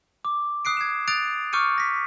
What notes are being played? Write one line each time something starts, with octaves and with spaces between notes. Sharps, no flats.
D6
D#6 F#6 C7 D7
G#6 E7
D#6 F#6 A6 D7 F7
C#6 D6 F6 G6 C#7 D#7
A#6 B6